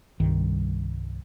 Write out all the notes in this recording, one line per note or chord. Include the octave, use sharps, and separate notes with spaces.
C2 G2 D#3